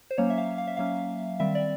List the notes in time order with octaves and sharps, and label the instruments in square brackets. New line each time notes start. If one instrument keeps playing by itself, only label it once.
[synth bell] C5
F#3 A#3 C#4 C#5
E5
F5
F5
E5
F#3 A#3 C#4 F5
D#3 G3 C4 E5
D5